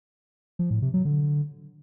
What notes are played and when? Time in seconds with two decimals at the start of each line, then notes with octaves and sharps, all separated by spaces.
0.59 F3
0.71 A2
0.82 C3
0.94 F#3
1.05 D3